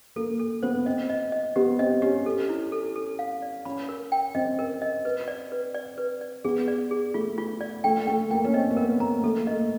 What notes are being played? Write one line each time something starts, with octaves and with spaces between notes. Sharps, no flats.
A#3 A4
A4
B3 C5
C4 D#5
D#5
D#5
B3 G4
C4 D#5
C#4 G4
A4
E4
A4
A4
F5
D5
C#4 B5
A#4
G5
C4 D#5
A#4
D#5
B4
D5
B4
D5
B4
D5
B3 G#4
D5
G#4
A3 F4
F4
D5
A3 G5
A3 G5
A#3 G5
C#4
C4 D#5
A#3
B3 A#4
A#3 A#5
A3 A4
A#3
A3 D#5